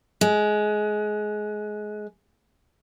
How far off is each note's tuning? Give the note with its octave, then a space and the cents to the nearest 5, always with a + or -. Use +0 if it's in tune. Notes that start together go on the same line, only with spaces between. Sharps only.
G#3 +20